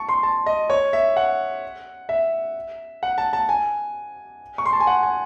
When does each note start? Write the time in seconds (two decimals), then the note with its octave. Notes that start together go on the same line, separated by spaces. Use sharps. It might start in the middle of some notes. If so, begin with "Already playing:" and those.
Already playing: A5 C#6
0.09 C6
0.23 A5
0.46 D#5
0.70 C#5
0.93 E5
1.16 F#5
2.09 E5
3.03 F#5
3.18 A5
3.33 A5
3.49 G#5
4.58 C#6
4.66 C6
4.73 A5
4.80 G#5
4.87 F#5
5.03 G#5